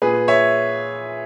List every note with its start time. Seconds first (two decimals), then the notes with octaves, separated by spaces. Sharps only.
0.02 A#2 G#4 B4
0.28 C#5 E5